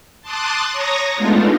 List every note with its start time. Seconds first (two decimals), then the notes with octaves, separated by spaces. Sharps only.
0.22 A5 C6 D6 D#6 F#6 A6
0.73 C#5 A#5 C#6 D#6 A#6
1.16 G#3 A3 B3 D4 D#4 F4